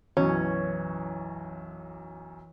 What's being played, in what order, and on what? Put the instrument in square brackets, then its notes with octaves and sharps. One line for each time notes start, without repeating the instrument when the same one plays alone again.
[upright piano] B1 F#2 [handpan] E3 C#5 [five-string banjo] C#4